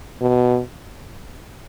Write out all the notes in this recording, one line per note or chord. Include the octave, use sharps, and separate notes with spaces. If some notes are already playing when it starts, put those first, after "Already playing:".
B2